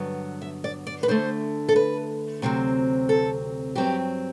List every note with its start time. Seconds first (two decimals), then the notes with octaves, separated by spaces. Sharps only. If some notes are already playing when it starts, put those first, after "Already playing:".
Already playing: G2 D3 F#3 B3
0.42 E5
0.64 D5
0.87 D5
1.03 B4
1.08 D2 D3 A3 C5
1.69 A4
1.76 B4
2.42 D2 C3 F#3 C4
3.09 A4
3.75 G2 F#3 C4 G4